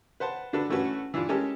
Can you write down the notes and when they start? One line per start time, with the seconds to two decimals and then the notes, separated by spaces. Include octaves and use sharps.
0.20 B4 C5 F#5 A5
0.53 D3 D4 F#4 A4 B4
0.69 E3 A3 C#4 F#4 B4
1.14 E3 D4 E4 F4
1.29 G#3 C#4 G4 A4 A#4 G#5